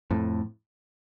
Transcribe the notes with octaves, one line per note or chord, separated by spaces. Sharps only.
F2 A2